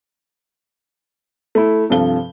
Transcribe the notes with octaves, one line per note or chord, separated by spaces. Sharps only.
A3 E4
G2 C3 F3 A4 G7